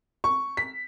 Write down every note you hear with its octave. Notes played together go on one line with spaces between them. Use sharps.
C#6
B6